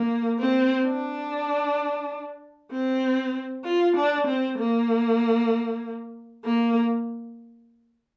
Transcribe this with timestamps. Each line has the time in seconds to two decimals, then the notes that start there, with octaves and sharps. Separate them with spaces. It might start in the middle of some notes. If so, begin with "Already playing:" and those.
Already playing: A#3
0.39 C4
0.86 D4
2.71 C4
3.65 F4
3.96 D4
4.27 C4
4.58 A#3
6.45 A#3